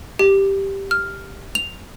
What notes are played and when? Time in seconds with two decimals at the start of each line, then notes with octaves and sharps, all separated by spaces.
0.19 G4
0.91 F6
1.55 F7